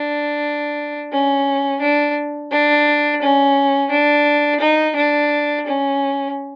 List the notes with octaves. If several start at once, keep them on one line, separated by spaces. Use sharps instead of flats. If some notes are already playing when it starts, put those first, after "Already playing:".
Already playing: D4
C#4
D4
D4
C#4
D4
D#4
D4
C#4